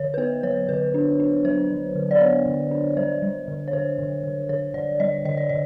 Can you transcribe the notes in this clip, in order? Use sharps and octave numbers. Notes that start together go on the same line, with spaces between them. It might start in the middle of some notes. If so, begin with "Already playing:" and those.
Already playing: D3 C#5
B4
B3 C5
F#3 C#5
D3 B4
D4
D4
F#3 C5
F#3
D3
D5
B3 C#5
D3
D4
G3 C5
G3
D3
C#5
D3 C5
D3
D3
D3 C#5
D3 D5
G3 D#5
D3 D#5
D5
D3 D#5